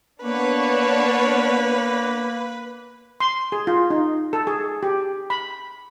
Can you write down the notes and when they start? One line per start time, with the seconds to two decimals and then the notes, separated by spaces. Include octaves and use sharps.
0.23 A#3 B3 D4 B4 C#5
3.20 C6
3.52 G#4
3.67 F4
3.90 D#4
4.33 A4
4.47 G#4
4.83 G4
5.30 B5